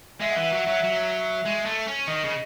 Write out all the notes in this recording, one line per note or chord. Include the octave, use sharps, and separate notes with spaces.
G#3 E5
E3 F#5
E5
F#3 F#5
F#3 E5
F#3 E5
G#3
A3
C#4
D#3 D#5
C#3